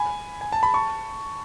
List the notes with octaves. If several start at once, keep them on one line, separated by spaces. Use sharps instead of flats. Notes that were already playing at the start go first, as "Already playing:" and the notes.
Already playing: G#5 B5
G#5
A5
B5
A5 C#6